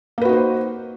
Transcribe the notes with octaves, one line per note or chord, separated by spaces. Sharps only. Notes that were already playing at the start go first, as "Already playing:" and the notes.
A#3 D#4 F#4 B4 C5